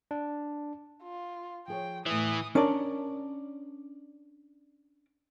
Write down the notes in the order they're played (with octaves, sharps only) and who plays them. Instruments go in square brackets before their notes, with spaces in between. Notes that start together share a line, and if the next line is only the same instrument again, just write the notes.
[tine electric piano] D4
[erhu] F4
[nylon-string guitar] F3 G#4 C#5 [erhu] G5
[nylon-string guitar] E2 A2 [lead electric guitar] E3 [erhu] D#6
[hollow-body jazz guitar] C#4 D4 A#4 D5